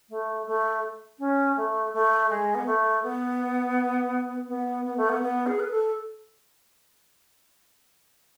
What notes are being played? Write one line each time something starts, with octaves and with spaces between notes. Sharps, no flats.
A3
A3
C#4
A3
A3
G#3
B3
A3
B3
B3
B3
A3
B3
B3
G#4
B4
A4